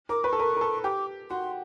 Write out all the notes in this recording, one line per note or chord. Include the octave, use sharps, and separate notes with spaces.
A#4 D6
B4 C#6
A4
A#4
A#4
A4
G4 D6
F#4 C6